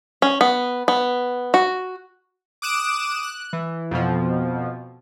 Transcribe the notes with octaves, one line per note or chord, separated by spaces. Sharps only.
C#4
B3
B3
F#4
D6 D#6 F#6 D7 E7
F#6
E3
F2 B2 F3